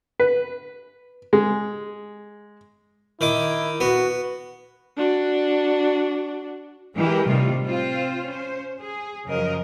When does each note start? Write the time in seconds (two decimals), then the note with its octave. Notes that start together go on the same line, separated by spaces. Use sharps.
0.20 B4
1.33 G#3
3.21 D#3 E4 D6
3.80 B3 F#4
4.97 D4 F#4
6.96 E3 G#3 G4 A#4
7.25 A2 C3 D#3 G3 A3 F4
7.65 C4 F4 C5
8.24 C#4 C5
8.81 G#4
9.27 F#2 C#3 F3 F#3 A#4 D#5